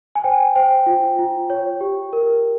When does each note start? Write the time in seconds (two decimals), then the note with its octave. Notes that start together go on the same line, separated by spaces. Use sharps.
0.15 G#5
0.24 C5 G5
0.56 C5 G5
0.86 F4
1.19 F4
1.50 C#5
1.81 G4
2.13 A#4